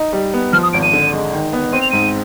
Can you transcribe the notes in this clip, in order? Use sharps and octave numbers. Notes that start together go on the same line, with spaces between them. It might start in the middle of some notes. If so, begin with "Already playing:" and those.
Already playing: D#4
G3
B3
F3 F6
D#6
G#1 D7
D#7
D3
G#3
D#3
B3
C4 D#7
F7
G#2 D#7